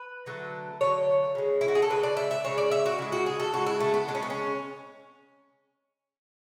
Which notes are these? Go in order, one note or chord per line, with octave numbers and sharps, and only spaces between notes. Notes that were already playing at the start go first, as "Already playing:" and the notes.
Already playing: B4
D3 F#3 A3
D3 F#3 A3 C#5
C#3 G#3
E4
F#4
G#4
A4
C#3 G#3 B4
D5
E5
E5
C#3 G#3 C#5
D5
E5
F#4
C#3 G#3 E4
F#4
G#4
A4
C#3 G#3 F#4
E4
A3
B3
C#3 G#3 D4
C#4
B3
C#4